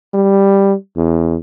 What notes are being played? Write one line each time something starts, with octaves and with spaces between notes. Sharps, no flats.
G3
E2